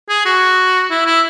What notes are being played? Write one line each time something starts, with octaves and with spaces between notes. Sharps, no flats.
G#4
F#4
E4
E4